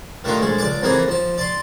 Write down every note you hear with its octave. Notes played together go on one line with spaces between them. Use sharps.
D#3 A3 D4 D#4 F4
A#1 G#3 A4
C#2 D5 A5 D6
F2 E3 A#3 D#4 G#4 A5
F3 A5
D5 A5 C6